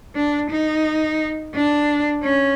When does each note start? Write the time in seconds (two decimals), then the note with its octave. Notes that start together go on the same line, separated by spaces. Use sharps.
0.15 D4
0.50 D#4
1.55 D4
2.24 C#4